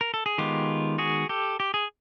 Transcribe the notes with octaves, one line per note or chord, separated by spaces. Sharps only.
A#4
A4
G#4
D#3 G#3 B3 F4 G4
F#4 G#4
G4 A4
G4
G#4